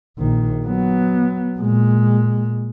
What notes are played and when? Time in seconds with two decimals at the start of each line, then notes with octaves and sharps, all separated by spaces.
0.18 A#1 D#3
0.66 F#3 B3
1.58 A#2 G#3